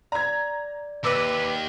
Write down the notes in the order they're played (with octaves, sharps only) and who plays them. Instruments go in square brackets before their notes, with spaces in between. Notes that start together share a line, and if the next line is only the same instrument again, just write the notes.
[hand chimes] D5 [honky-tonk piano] A#5 G#6
[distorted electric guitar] D#2 [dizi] B4 [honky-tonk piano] D6 E6